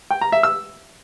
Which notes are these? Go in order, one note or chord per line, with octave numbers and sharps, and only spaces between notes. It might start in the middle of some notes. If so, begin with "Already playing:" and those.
G5
A#5
E5
E6